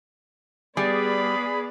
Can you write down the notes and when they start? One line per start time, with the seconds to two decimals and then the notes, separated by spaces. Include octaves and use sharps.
0.77 G3 B3 G#4 D5 B5